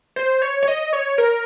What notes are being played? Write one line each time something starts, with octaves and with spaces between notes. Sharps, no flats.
C5
C#5
C#5
D#5
C#5
A#4